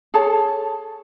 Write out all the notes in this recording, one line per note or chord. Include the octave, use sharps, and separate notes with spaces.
G#4 A4 C#5 A5